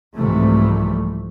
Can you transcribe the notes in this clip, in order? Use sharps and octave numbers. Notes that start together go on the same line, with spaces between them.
C2 G#2 C3 E3 F3 A3